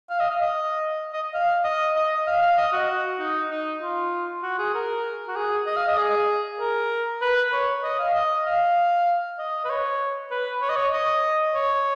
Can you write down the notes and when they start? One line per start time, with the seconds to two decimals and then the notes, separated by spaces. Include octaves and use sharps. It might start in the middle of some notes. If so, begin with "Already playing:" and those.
0.10 F5
0.20 D#5
0.30 F5
0.41 D#5
1.13 D#5
1.34 F5
1.64 D#5
1.96 D#5
2.27 F5
2.42 F5
2.57 D#5
2.73 F#4
3.19 D#4
3.50 D#4
3.82 F4
4.43 F#4
4.59 G#4
4.74 A#4
5.28 F#4
5.36 G#4
5.67 D#5
5.77 F5
5.88 D#5
5.98 G#4
6.60 A#4
7.21 B4
7.53 C#5
7.83 D#5
7.99 F5
8.14 D#5
8.46 F5
9.39 D#5
9.64 B4
9.69 C#5
10.31 B4
10.62 C#5
10.69 D#5
10.76 C#5
10.93 D#5
11.55 C#5